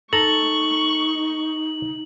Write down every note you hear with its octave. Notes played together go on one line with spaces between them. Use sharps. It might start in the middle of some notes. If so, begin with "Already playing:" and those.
D#4 A4 A#5 C#6 F#7